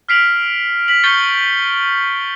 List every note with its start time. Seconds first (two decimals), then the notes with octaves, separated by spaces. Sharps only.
0.09 F6 B6 C7 D7 F7 F#7
0.88 B6 F#7
1.03 C#6 G6 A6 C7 C#7 G7